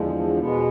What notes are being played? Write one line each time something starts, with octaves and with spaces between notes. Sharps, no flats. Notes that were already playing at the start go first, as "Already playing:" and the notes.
Already playing: E2 D3 F3 G#3
B2 G#3 B3